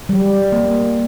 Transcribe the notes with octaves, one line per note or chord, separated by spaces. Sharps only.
G3
A#3